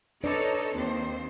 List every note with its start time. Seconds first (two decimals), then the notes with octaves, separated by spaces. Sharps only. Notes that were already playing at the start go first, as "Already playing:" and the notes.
0.24 D4 D#4 A4 B4 C#5 D5
0.74 D#2 C4 C5